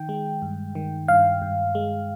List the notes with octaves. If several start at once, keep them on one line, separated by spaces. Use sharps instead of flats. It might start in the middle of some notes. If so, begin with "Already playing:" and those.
Already playing: D#3 G5
G#3
G2
D#3
G2 F5
G2
G#3